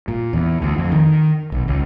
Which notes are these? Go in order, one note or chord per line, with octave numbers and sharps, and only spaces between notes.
A#2
E2
D2
F2
D#3
B1
C#2